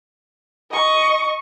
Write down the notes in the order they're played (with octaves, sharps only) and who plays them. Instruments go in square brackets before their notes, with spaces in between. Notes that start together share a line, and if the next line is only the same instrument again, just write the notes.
[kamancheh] D#5 C#6